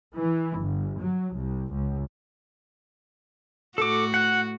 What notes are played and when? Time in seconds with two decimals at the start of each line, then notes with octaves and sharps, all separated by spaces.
0.15 E3
0.59 G1
1.00 F#3
1.34 C2
1.73 C#2
3.78 A2 F#4 A4 D6
4.14 F#5